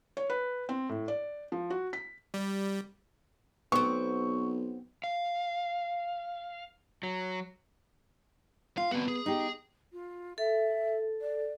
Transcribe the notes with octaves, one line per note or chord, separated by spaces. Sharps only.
C#5
B4
C4
A2
D5
F3
F#4
B6
G3
B1 B3 C4 C#6
F5
F#3
F4 F5
B3 C4 F#4
G#4
D#4 G4
F4
A4 E5
D5